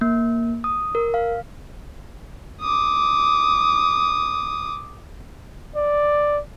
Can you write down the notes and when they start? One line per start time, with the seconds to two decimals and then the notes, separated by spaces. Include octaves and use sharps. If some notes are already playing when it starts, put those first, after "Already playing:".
0.01 A#3
0.64 D#6
0.95 A#4
1.14 F5
2.61 D6 D#6
5.76 D5